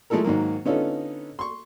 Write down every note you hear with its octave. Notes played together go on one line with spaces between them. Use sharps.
F3 G#3 A3 E4 A4 A#4
G#2 D#3 F#3 A#3
D3 B3 C#4 D#4 F4 A4
C6 C#6